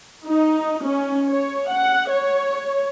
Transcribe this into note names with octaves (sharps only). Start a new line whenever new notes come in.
D#4
C#4
C#5
F#5
C#5